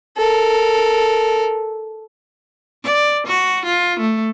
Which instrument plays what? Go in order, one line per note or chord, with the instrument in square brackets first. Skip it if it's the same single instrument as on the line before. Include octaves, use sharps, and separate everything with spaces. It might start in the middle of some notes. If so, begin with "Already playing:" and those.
[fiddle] A4 A#4
[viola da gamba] D5
F#4
F4
A3